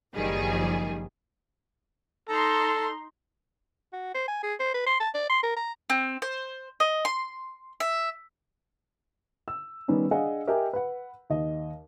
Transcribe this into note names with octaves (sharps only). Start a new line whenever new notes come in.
F#1 D#3 F3 G3 G#4
D#4 A4 A#5 C6
F#4
C5
G#5
G#4
C5
B4
C6
A5
D5
C6
A#4
A#5
C4
C5
D#5
C6
E5
E6
D#3 G3 B3 C#4 D#4
D4 G#4 D#5 F5 F#5
G4 A#4 D#5 E5 G5 G#5
B4 F#5
D#2 D#5